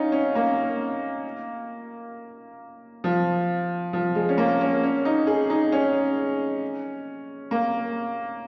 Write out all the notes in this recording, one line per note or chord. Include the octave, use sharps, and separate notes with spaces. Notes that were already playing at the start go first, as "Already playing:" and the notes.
Already playing: C#4 D#4 F4
C#4
A#3
F3
F3
G#3
C#4
A#3
C#4
C#4
D#4
G#4
D#4
C#4
A#3